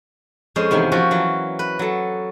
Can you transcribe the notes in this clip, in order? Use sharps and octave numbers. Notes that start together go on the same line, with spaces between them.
F2 G#3 C#4 C5
E2 C3 D#3 A#3
F3 C#4 F#4 G4
E3 F#3
B4
F#3 A4